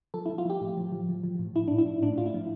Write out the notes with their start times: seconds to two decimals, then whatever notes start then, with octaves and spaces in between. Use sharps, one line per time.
0.14 F3 A4
0.26 E4
0.29 F3
0.38 F4
0.45 F3 G4
0.61 A2
0.77 F3
0.92 F3
1.09 F3
1.24 F3
1.39 A2
1.56 A2 E4
1.68 D4
1.71 A2
1.78 E4
1.87 A2
2.02 A2 D4
2.18 A2 F4
2.26 E4
2.34 F3